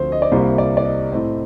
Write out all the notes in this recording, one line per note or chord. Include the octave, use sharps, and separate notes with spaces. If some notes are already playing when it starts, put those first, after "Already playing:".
Already playing: D2 D3 F3 C4 C5
D#5
D5
C2 C3 G3 A#3 C5
D5
D5
D#5
A2 A3 C4 D#5